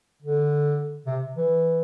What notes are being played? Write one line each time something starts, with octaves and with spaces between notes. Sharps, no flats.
D3
C3
E3